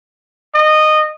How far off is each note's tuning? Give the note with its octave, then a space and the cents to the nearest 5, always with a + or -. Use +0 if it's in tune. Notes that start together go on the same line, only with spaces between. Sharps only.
D#5 -15